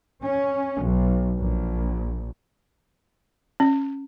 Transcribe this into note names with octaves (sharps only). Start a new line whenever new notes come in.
C#4
B1
A#1
C#4